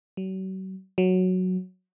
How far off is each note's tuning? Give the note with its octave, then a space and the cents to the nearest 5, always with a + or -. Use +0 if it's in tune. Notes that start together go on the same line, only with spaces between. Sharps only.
F#3 +40
F#3 -5